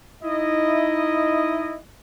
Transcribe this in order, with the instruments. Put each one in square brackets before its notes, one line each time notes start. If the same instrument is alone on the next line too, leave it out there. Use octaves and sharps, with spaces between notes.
[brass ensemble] D#4 E4 D#5